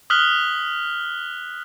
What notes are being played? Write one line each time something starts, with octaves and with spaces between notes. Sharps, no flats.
D#6 F6 F#6 B6 F#7 G7